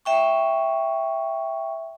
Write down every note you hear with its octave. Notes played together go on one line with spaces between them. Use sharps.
E5 G5 C#6